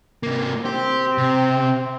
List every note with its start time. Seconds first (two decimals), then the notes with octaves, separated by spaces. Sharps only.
0.23 C3 A#3
0.65 C4 G4
1.18 C3